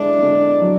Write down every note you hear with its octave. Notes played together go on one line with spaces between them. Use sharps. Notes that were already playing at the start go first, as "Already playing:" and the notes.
Already playing: D3 G#3 D4 E4
D3
F#3